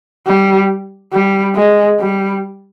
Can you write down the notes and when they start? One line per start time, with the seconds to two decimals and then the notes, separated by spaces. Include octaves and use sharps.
0.27 G3
1.13 G3
1.56 G#3
1.99 G3